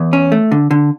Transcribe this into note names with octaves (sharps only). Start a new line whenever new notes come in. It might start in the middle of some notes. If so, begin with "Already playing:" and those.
Already playing: E2
C#4
A3
D3
D3